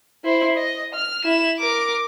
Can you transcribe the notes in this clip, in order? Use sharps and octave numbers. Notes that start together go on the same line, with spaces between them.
E4 C5
D#5
F6
E4 E7
A#4 D6